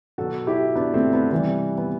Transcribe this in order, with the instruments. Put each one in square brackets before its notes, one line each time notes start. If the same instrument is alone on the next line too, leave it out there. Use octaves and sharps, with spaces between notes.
[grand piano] B2 F#3 F#4 A4
E4 G4
B3 D4
A3 C4
B3
C3 E3 G3 B3
B3